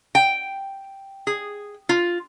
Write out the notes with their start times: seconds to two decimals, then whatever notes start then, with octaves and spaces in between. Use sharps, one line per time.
0.15 G5
1.27 G#4
1.89 F4